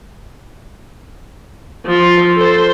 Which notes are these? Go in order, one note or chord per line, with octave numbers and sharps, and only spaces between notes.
F3
A4 C5